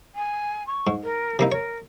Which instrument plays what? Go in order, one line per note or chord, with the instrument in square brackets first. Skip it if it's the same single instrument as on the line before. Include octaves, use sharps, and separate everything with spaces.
[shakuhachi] G#5
C#6
[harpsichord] G#2
[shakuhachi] A#4
[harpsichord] C3 A#3 D#4 [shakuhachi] E4
[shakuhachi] A#4 [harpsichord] C#5